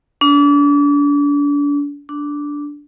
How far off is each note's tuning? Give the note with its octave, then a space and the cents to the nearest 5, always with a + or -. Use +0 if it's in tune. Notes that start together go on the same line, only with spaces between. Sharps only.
D4 -35
D4 -10